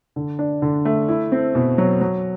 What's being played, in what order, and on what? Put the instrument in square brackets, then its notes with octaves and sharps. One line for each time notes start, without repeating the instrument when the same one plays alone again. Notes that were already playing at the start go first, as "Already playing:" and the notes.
[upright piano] D3
D4
D3
A3
E4
C4
B2
F#3
F#3